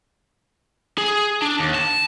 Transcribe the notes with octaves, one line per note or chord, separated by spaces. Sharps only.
G#4
D4
D#2
A5